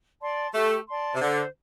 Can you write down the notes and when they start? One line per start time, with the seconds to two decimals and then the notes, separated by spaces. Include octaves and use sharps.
0.21 D5 A5 C6
0.54 A3 G4
0.87 D5 A5 C6
1.14 C3
1.21 D3 C5